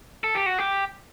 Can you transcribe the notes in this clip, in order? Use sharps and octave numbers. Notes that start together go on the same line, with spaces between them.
A4
G4
F#4
G4